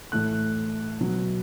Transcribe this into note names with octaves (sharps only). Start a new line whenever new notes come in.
A2 E3 A3 F#6
B2 F#3 B3